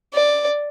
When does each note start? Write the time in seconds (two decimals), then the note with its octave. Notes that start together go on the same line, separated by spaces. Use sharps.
0.13 D5